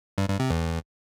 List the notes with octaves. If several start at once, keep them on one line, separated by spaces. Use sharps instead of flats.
G2
G2
C3
E2